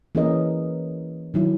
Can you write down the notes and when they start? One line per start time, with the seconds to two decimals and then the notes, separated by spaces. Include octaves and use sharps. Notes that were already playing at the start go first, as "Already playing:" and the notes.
0.15 E3 A#3 C#4 G#4 A#4 D#5
1.34 D#3 F#3 E4